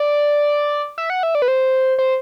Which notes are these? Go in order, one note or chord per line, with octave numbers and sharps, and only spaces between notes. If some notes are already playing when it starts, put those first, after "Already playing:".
Already playing: D5
E5
F#5
E5
D5
B4
C5
C5